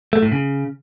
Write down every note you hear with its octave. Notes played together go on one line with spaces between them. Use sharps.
A3
A2
C#3